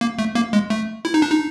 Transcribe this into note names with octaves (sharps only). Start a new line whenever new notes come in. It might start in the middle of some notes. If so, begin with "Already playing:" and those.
A#3
A3
A#3
G#3
A3
E4
D#4
D4
D#4